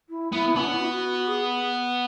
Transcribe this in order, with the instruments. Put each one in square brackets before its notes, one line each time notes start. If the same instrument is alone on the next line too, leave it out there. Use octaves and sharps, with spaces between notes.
[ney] E4
[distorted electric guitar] B3 [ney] E4
[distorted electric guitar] B3 [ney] C#4
[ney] D4
E4
F#4
F#4
G#4